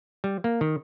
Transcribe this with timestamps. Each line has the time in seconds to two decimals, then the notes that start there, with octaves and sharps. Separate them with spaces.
0.24 G3
0.44 A#3
0.61 D#3